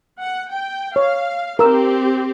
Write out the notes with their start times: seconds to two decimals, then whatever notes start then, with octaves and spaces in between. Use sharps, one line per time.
0.21 F#5
0.51 G5
0.96 C#5 F5
1.59 C4 G4 A#4 E6